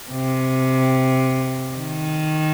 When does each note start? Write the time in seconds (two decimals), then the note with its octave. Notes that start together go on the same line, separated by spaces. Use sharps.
0.11 C3
1.76 D#3